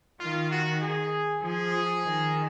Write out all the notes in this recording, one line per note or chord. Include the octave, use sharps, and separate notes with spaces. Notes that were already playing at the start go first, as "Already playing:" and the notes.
D#3 F4
F#4
G#4
F3 G#4
D#3